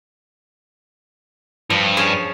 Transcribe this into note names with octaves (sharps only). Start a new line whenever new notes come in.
G2 F3
C#4 F4 G#4